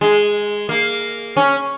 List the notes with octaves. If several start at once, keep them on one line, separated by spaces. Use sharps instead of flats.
G#3
A#3
C#4